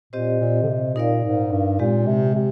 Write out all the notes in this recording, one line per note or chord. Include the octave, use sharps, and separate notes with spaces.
A#2 C4 G4 C5 D#5
A#2
D3
C3
A#2 D#4 A#4 D5 F5
G#2
G2
A#2 G#3 C4 G4
C3
C3